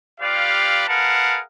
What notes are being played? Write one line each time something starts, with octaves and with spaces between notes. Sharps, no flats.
G3 F4 G4 B4 D5 F5
G#4 A#4 B4 F5 F#5 A5